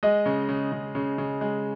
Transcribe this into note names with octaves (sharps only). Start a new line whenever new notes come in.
G#3 D#5
C#3
C#3
C#3
C#3
C#3
G#3